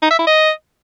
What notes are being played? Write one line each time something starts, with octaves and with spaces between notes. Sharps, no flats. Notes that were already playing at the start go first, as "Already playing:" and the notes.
D#4
E5
E4
D#5